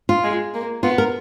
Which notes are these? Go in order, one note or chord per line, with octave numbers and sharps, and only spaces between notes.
F4
G#3
A#3
B3 F4
A#4